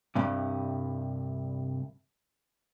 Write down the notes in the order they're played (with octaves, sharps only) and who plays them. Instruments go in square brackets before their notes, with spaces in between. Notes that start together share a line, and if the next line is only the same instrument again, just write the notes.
[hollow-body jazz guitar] C2 G2 C3